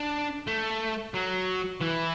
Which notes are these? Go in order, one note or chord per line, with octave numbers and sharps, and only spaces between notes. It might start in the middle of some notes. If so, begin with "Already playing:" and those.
Already playing: D4
A3
F#3
E3